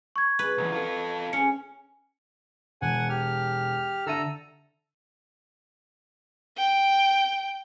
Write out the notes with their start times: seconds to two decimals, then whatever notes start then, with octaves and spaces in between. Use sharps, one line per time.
0.16 C#6 G#6
0.39 B4
0.58 B1 E2
0.72 F4 A4
1.33 C#4 C#7
2.82 E1 F#5 G#5
3.10 G4 F6
4.07 D3 A4 E5 A#5 E6 D#7
6.57 G5